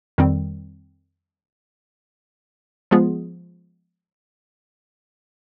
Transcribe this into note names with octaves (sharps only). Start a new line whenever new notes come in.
F2 D#3 G3 C4
F3 G#3 B3 F4 G#4